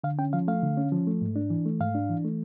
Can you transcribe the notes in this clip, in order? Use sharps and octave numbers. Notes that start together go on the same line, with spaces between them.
D3 F5
C#4 G5
F3 F5
A3 F5
D3
C#4
F3
A3
G#2
D4
E3
A3
G#2 F5
D4
E3
A3